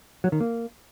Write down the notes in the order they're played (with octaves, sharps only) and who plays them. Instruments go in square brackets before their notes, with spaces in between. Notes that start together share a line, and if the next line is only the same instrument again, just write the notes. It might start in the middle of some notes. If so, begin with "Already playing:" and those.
[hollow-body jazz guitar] F#3
D#3
A#3